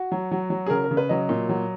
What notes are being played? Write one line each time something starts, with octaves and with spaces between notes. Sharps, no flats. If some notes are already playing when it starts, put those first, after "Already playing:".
Already playing: F#4
F#3
F#3
F#3
G#4
C#3 A#4
A#4
C#3
B4
F#3 D#5
A#2
F#3